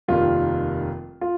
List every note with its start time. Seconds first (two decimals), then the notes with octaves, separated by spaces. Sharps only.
0.08 F1 D#2 D#3 G3 A#3 F4
1.21 F4